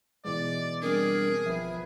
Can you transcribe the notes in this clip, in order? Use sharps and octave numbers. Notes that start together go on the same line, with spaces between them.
B2 E3 G#3 D5
G3 C4 D4 G#4 A#4
G#1 F3 B4 E5